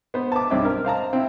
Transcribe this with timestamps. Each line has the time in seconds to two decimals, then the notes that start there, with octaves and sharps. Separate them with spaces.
0.14 B3 C5
0.32 A5 D6
0.50 B1 G2 C4 C#4 E5 D6
0.65 A#4
0.85 C5 F5 A5 A#5
1.13 C4 E4